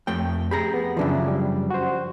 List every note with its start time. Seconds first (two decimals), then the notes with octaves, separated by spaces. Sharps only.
0.07 F2 A3 G5
0.51 G4 G#4 A#5 B5
0.74 B3
0.97 F#2 C#3 E3 F3 D4 E4
1.28 G3
1.70 F#4 C5